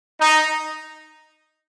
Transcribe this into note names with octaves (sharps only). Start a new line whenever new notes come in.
D#4